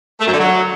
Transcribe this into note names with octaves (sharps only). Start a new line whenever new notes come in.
A3
F#2
D3
F#3